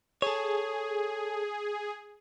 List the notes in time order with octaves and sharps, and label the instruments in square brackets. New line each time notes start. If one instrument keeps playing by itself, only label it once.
[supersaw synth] G#4 [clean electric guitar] A4 C#5